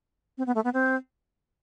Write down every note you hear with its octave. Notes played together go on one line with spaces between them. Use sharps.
C4
B3
A3
B3
C4